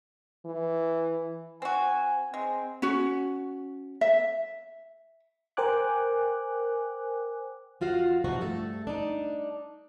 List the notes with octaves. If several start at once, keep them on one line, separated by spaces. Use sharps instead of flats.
E3
C4 F#4 G#5
G#3 C4
C#4 F#4
E5
A#4 C5 G5 G#5 D6 F#6
F2 F4 F#4 F5
C3 F3 D#4 F#4
G2 A3 A4
D4 D#4